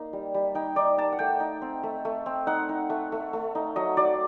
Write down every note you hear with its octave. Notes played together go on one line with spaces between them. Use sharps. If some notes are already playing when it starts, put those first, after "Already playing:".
Already playing: A#3 D#4
G3
G3
D#4 G5
D#4 D5
D#4 A5
F#5
A3 G5
D#4
C4
A3
A3
C4
D#4 F#5
D#4
A3
A3
A3
D#4
F#3 D#5
F#3 D5